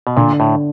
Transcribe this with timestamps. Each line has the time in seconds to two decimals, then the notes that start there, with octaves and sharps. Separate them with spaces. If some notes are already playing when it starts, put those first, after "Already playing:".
0.07 B2
0.17 A#2 D3
0.40 A2